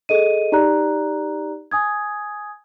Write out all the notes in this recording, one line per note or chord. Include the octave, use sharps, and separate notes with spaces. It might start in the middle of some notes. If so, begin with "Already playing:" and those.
G#4 A4 D#5 D#7
D#4 G4 D5 A#5 F#6
G#5 D#6 G#6